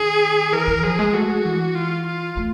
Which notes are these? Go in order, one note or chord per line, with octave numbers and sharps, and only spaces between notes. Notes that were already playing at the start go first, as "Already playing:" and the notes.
Already playing: D#3 G#4
E3 A#4
E3
F3 G#4
G#3
A3 F#4
G#3
E3
F4
F4
A3